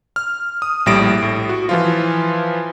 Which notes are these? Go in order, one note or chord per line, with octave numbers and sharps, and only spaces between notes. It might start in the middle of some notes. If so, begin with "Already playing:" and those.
F6
D#6
A#1 A2 G3 A#6 D7
A2
F#4
E3 F3 F4